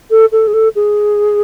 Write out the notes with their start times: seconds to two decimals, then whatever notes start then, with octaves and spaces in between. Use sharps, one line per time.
0.11 A4
0.32 A4
0.47 G#4
0.54 A4
0.76 G#4